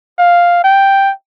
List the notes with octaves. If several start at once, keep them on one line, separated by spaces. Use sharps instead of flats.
F5
G5